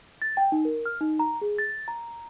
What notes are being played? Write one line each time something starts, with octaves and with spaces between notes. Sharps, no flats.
A6
G5
D#4
A#4
F6
D#4
A#5
G#4
A6
A#5